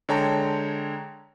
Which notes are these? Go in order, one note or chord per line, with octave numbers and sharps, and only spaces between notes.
D3 G#3 C#5 G5 A5 A#5